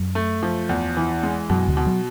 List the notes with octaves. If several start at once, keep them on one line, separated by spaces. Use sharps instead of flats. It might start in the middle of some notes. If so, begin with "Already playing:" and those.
Already playing: F#2 F#3
A3
F3
E2
E3
G#3
F#2 B2 F#3
D2 D3
B2
F#3